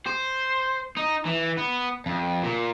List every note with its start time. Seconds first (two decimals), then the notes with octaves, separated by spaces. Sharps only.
0.07 C5
0.97 D#4
1.25 E3
1.57 B3
2.06 F2
2.44 A#2